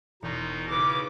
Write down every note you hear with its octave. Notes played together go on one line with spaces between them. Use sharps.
E1 B2 D#4 A#5 C6
C#3 D#4 B4 C#5 D6